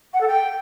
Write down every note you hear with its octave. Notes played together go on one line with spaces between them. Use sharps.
F#5
A4
G5